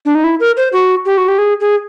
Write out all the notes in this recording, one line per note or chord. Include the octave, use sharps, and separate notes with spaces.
D4
D#4
E4
A#4
C5
F#4
G4
F#4
G4
G#4
G#4